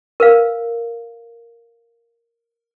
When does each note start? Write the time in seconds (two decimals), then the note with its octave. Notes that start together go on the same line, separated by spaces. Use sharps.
0.20 A#4 B4 F5